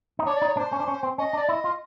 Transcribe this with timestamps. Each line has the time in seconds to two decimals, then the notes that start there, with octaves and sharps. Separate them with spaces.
0.19 D#4
0.26 D4 C#5
0.37 D5
0.42 D#4
0.47 C#5
0.57 D4 C5
0.72 C#4
0.80 D4
0.88 C#4
1.03 C4
1.18 C#4 D#5
1.33 D4
1.38 D5
1.48 E4 D#5
1.64 F4